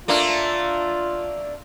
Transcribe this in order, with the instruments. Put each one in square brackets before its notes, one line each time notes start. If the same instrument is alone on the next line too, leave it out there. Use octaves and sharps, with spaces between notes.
[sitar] A3 A#3 D4 [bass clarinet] F4